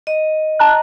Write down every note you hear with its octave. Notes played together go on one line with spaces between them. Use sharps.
D#5
A5 A#5 F#6